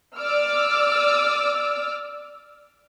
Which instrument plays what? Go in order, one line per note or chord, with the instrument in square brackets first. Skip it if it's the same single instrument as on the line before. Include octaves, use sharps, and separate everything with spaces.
[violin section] D5 D6 E6 F6